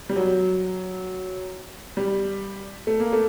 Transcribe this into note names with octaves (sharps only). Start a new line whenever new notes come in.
G3
F#3
G3
A3
A#3
A3